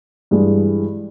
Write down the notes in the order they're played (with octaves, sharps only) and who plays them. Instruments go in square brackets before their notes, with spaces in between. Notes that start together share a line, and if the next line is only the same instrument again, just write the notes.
[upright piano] G2 E3 G#3